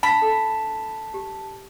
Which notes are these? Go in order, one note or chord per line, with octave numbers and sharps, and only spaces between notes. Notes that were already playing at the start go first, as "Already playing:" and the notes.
D4 A5 B5 B6
A4
G4